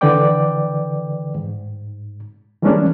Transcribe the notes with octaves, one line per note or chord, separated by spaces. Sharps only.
D3 E3 B4 D5 G5 D6
G#2
E3 G3 G#3 A#3 C#4 D4